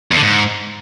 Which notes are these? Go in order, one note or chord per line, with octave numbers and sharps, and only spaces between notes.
E2
D3
G#2